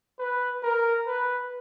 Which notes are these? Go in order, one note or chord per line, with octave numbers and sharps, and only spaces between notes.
B4
A#4
B4